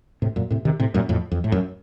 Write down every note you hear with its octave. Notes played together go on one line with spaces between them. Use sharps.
A2 C3
F#2 A#2
A2 C3
C3 D#3
A2 C3
F#2 A#2
F2 A2
F2
A2
F#2